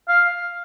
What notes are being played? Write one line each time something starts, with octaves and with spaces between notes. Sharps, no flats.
F5